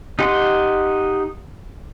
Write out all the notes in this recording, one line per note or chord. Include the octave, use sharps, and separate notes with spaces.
D#4 G4 F#5 C6